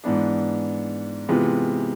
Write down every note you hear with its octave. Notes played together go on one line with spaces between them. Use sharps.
G#2 E3 B3 D4
C3 E3 G#3 B3 F4